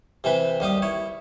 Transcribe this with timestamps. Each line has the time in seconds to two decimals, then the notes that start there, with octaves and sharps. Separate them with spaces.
0.24 C3 E3 C4 B4
0.60 D#2 G3 G4 D#6
0.82 E4 C#5